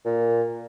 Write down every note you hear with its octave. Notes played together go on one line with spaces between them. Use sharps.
A#2